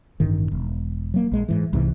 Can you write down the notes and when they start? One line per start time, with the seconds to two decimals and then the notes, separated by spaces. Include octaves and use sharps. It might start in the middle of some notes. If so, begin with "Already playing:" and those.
0.20 A1 G2 D#3
0.52 E1
1.14 F#3 A#3
1.32 A#1 G#3
1.49 G#2 E3
1.73 C2 G#2 C3 E3